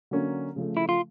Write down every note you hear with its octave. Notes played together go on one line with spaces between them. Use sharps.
D3 F#3 A#3 C#4
C#3 F3 A3
E4
F4